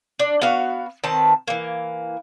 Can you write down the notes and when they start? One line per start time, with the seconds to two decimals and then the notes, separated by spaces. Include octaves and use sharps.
0.19 D4
0.42 B3 F#4 F5
1.04 D#3 C4 B4 A5
1.48 E3 A#3